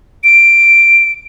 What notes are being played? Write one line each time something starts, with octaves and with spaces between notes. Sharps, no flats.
D7